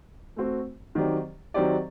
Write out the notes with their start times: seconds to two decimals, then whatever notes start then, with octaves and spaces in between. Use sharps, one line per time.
0.36 A3 C4 F#4
0.95 D#3 F#3 C4 G4 D5
1.54 D#3 F#3 C4 G4 D5